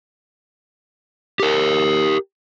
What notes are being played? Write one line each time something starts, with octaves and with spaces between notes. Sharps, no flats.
G4 A#4